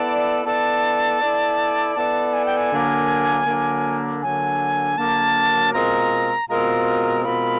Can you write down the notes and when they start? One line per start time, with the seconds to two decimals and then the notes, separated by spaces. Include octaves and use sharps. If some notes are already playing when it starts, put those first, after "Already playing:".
Already playing: B3 E4 A4 D5 A5
0.45 B3 E4 A4 D5 A5
1.20 B3 E4 A4 D5
1.96 B3 E4 A4 D5 A5
2.33 G#5
2.46 G5
2.57 G#5
2.71 D3 F#3 A#3
3.47 D3 F#3 A#3
4.22 D3 F#3 A#3 G#5
4.98 D3 F#3 A#3 A5
5.73 B2 G#3 C4 F4 A#4 A#5
6.49 B2 G#3 C4 F4 A#4 A#5
7.24 B2 G#3 C4 F4 A#4 B5